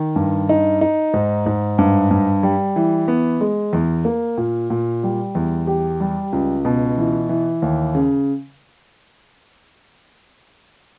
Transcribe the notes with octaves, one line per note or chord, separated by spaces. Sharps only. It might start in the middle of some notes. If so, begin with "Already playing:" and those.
Already playing: D#3
G2
D#4
D#4
G#2
G#2
G2
G2
G3
E3
B3
G#3
E2
A#3
A#2
A#2
G3
E2
G4
G3
C#2
B2
E3
E3
D#2
C#3